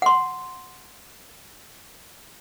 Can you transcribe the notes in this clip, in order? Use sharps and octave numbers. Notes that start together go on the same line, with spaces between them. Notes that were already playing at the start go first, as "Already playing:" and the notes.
F#5 C6